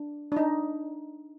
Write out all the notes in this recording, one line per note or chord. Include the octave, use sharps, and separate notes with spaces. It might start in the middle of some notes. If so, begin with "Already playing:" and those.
Already playing: D4
D4
D#4